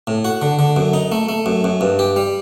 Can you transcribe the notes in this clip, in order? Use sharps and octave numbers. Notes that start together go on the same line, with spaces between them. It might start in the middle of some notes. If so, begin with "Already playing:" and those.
A2
F#4
D3
D3
F#2
D#4
A3
A3
F#2
F#2
G2
G4
G3